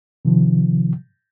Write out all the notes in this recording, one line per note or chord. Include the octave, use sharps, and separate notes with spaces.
C3 D#3 F3